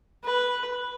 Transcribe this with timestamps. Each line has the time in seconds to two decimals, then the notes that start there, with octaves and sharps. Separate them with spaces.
0.24 B4